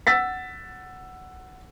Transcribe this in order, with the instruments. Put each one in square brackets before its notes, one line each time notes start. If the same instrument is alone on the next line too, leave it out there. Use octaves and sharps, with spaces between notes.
[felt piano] F#5 E6 A6 B6